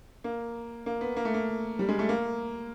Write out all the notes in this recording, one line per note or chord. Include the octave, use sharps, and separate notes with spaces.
A#3
A#3
B3
A#3
A3
A#3
G3
G#3
A3
A#3